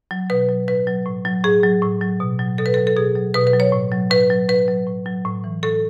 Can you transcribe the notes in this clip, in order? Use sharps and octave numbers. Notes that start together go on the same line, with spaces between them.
F#3
B2 B4
F#3
A2 B4
F#3
A2
F#3
A2 G#4
F#3
A2
F#3
B2
F#3
B2 A4
B4
A4
F#3
A4
B2 G#4
F#3
B2 B4
B4
F#3
C#5
A2
F#3
A2 B4
F#3
A2 B4
F#3
A2
F#3
A2
E3
A2 A4